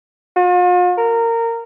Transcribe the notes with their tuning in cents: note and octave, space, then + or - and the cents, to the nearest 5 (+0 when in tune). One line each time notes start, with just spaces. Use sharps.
F4 +45
A#4 -20